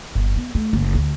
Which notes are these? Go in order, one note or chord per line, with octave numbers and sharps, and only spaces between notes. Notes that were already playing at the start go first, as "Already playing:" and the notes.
G1
B3
A3
F#1
D2